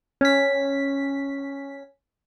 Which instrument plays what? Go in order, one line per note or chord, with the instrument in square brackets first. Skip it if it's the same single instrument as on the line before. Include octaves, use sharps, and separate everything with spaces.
[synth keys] C#4 B6